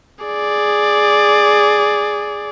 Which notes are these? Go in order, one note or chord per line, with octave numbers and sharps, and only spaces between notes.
G#4 D5